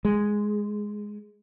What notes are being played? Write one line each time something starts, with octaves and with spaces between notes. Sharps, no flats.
G#3